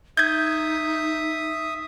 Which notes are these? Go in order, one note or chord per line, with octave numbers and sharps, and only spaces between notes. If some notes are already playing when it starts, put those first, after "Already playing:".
D#4 E5 D#6 G6 G#6